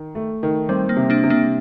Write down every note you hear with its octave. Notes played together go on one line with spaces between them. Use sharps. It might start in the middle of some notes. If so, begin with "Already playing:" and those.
Already playing: D#3
A3
D#3
G3 C4
A#3
C3
A#3 D4
C3
A#3 D4